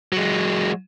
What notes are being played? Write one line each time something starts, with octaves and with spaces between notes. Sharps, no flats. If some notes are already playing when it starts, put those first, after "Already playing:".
F#3 G#3